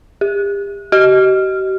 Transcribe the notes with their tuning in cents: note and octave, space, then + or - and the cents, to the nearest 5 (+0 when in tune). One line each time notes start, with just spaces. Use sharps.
G4 +40
G4 -45